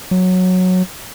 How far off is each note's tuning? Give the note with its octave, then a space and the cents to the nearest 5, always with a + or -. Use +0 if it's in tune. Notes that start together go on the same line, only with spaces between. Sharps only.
F#3 -10